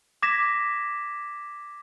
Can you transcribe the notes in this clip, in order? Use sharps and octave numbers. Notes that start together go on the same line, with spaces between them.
D6 G#6 A#6 B6 E7